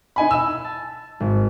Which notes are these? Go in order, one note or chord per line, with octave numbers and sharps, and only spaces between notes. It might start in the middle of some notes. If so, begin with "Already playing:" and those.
D#4 G#5 B5
E6
A5
G#1